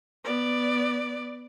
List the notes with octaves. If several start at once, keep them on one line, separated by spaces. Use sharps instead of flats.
B3 D5